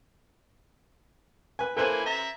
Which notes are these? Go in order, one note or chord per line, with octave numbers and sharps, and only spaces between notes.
B4 G#5
A#3 E4 A4 B4 C5 G#5
E5 A#5